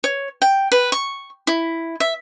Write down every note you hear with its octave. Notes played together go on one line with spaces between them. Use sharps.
C#5
G5
B4
C#6
E4
E5